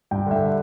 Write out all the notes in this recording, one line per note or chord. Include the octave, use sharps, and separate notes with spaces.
G2 G5
D3 E5